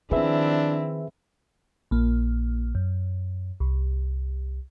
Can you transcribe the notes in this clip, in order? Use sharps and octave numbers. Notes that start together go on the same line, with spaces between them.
D#3 F3 C4 D4 E4 G#4 B4 E5
A#1 A#3
F#2
C2